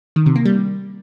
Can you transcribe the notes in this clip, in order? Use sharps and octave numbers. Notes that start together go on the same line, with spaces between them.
D#3
C3
A#3
G3